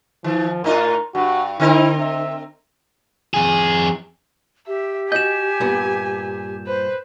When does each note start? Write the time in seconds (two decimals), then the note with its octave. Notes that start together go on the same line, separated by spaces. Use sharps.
0.24 D#3 F3
0.64 A2 D#4 F4 A#4
1.15 G2 F#4
1.60 D3 C4 E4 A#4
2.00 E5
3.34 F2 G#4
4.68 G4 E5
5.12 F#4 D#5 G#5 G6 E7
5.60 G2 A#2 B3
6.67 B4 C5